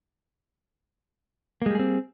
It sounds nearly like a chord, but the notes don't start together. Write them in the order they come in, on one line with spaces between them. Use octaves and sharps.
A#3 G#3 G3 G#4 C4